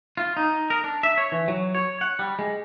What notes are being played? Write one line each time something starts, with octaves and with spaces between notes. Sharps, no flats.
F4
D#4
A#4
D4
E5
C#5
E3
F#3
C#5
F#5
G3
G#3